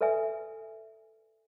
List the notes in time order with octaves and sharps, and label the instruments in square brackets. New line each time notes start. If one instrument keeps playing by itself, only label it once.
[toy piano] A4 B4 D5 E5 G#5